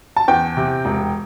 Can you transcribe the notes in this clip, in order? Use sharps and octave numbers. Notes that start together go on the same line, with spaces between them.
A5
E2 G5
C3
E1